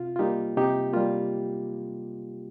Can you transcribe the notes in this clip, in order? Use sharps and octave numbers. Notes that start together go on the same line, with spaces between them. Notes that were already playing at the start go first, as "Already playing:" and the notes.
Already playing: C3 F4
F4
G3 A#3 D#4 G4
C3 D#4 G4
G3 A#3 F4